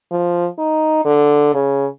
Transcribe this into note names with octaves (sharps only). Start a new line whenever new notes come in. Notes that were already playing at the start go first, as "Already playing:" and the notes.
F3
D#4
D3
C#3